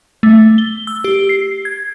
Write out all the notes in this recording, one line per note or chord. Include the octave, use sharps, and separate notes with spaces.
A3
G7
E6
G4
C7
G#6